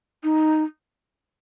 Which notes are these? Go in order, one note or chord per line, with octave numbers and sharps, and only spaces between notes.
D#4